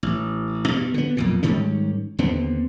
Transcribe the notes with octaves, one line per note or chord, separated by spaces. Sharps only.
A1
G2 B2
D3 B3
B1 F2 A#2
G#2 D#3 G3 C#4
D#2 D3 B3 C4